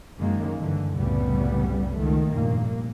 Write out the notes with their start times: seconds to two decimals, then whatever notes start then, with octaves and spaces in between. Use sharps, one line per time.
0.19 F#2 D#3 G#3 A#3
0.59 G2 D3 E3
0.95 C2 F#2 A2 C#3 G3 B3
1.98 C#2 D#3 A3
2.31 F1 G2 A#2 A#3